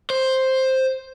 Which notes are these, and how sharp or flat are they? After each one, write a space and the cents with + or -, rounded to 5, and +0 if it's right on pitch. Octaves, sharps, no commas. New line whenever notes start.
C5 +5